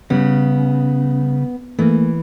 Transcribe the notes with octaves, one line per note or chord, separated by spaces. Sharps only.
C#3 G3 B3 C#4
E3 A3 A#3